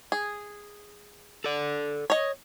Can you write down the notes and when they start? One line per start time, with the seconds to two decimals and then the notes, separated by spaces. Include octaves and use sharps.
0.12 G#4
1.44 A4 D5
2.10 C#5 D#5